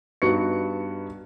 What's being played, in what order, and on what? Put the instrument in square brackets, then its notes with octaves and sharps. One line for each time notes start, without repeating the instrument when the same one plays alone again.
[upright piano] G2 B3 D#4 F#4 C#6 C#7